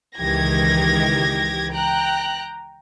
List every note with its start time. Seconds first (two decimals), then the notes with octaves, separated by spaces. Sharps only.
0.18 C#2 D#3 E3 G4 G#6 A#6
1.72 G5 A#5 F#6